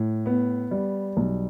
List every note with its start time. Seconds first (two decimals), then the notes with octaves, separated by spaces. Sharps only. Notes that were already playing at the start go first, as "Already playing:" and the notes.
Already playing: A2
0.26 B3
0.71 G3
1.17 B1